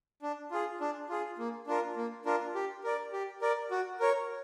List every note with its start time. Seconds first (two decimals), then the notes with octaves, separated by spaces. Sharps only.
0.22 D4
0.51 F4 G#4
0.80 D4
1.09 F4 G#4
1.38 A#3
1.67 D4 F4 A#4
1.96 A#3
2.25 D4 F4 A#4
2.55 G4
2.84 A#4 D5
3.13 G4
3.42 A#4 D5
3.71 F#4
4.00 A#4 C#5